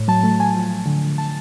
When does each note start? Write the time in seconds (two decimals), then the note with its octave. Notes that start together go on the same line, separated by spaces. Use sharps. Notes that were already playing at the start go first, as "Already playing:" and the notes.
Already playing: A2
0.08 F#3 A5
0.23 A3 A5
0.39 F#3 G#5
0.54 F3
0.70 F3
0.86 D3
1.02 D3
1.18 A5